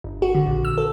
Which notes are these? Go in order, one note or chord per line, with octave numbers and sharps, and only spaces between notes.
G1
F#4
D3
A#1
E6
A4